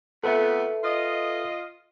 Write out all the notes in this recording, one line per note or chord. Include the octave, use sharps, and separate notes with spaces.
F2 A3 B3 A4 B4 E5
F4 D#5